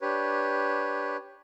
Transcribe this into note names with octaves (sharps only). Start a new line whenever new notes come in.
D4 G4 B4 C#5